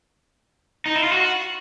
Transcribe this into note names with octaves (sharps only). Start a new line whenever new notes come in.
D#4
E4
F4
F#4